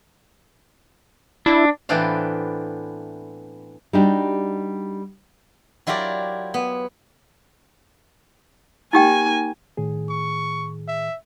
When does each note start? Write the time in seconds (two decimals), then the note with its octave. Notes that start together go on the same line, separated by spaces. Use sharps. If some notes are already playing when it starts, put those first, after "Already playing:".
1.46 D4 E4
1.89 A2 E3 B3 C4 D4 F5
3.93 G3 D4 D#4 F#4 G4
5.87 F#3 E4 F4 G4 A#4 D5
6.54 B3
8.93 A#3 D#4 G4 G5 G#5
9.77 A2 D#3 G#4
10.09 C#6
10.88 E5